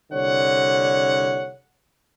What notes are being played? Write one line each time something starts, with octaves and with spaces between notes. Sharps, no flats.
C2 D3 C#5 F#5